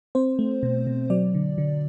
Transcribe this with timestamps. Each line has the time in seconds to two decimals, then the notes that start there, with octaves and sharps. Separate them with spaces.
0.15 C4 C5
0.39 A3
0.63 B2
0.87 B2
1.10 F#3 D5
1.34 D3
1.58 D3